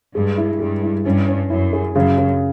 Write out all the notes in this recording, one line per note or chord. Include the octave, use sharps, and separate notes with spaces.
G2 G#3
E4
G2 G#3
E4
G2 C#4
C#4
F#2 E4
G#4
F#2 C#3
C#3